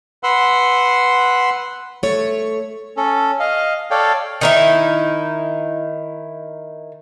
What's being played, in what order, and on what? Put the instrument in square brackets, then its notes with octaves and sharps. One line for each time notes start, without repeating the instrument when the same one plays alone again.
[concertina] B4 F#5 C6 E6
[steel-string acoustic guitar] A3 C#5
[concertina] C#4 A4
D#5 F5
A4 C#5 D5 F5 G5
[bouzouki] D#3 D#4 E4